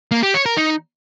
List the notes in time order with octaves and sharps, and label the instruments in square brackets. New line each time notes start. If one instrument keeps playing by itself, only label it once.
[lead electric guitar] A#3
G4
C#5
A#4
D#4